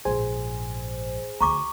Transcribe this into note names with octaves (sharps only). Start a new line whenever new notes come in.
A#1 G#2 G#4 C5 G#5
D2 A#5 C#6 D6